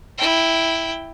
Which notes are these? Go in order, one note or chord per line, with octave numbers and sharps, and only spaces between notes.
E4 G5